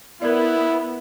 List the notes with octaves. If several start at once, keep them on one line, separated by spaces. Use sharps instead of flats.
B3 E4 A#4 D5